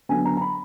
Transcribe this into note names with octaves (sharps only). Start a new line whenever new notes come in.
D3 F#3 B3 G#5
A#5
A#5
B5